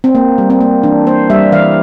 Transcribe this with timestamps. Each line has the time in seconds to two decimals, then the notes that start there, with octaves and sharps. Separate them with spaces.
0.04 C4
0.15 A#3
0.38 G3
0.50 C4
0.61 A#3
0.83 E3 D4
1.06 A#3 C5
1.30 G3 E5
1.52 E3 F5